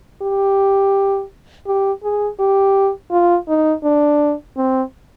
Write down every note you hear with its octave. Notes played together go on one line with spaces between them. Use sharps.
G4
G4
G#4
G4
F4
D#4
D4
C4